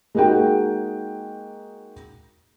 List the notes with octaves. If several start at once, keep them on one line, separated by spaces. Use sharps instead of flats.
G#3 A#3 D#4 F#4 G#4 G5